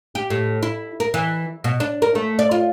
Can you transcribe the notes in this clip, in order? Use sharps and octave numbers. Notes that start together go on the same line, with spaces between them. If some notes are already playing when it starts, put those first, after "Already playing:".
G4
A2
E4
A#4
E3
B2
D4
A#4
A3
D5
F4